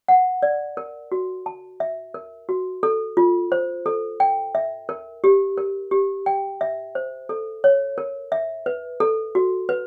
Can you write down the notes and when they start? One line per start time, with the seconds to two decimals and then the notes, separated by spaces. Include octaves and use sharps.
0.08 F#5
0.43 D5
0.77 A#4
1.12 F#4
1.46 A5
1.80 E5
2.14 A#4
2.49 F#4
2.83 A4
3.17 F4
3.52 C5
3.86 A4
4.20 G5
4.55 E5
4.89 A#4
5.24 G4
5.58 A#4
5.91 G4
6.26 G5
6.61 E5
6.95 C5
7.29 A4
7.64 C#5
7.98 A#4
8.32 E5
8.66 B4
9.00 A4
9.35 F#4
9.69 B4